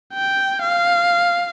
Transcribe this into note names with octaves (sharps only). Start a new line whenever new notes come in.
G5
F5